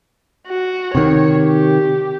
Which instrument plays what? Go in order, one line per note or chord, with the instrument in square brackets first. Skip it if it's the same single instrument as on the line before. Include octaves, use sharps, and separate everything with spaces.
[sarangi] F#4
[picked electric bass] C3 D#3 [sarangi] C#5
[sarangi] G4